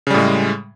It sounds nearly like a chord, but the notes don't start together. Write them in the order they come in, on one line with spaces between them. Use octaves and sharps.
C#3 G3 A2 G#3